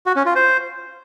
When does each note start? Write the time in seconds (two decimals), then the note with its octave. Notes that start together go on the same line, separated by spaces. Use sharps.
0.06 F#4
0.16 C#4
0.26 F4
0.36 C5